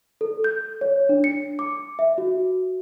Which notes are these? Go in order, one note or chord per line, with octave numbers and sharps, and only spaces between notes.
A4
G6
C#5
D4
C#7
D6
E5
F#4